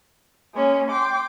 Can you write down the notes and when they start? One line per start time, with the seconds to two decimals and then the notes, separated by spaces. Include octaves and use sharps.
0.54 G#3 A#3 C#4
0.90 G5 C6 D6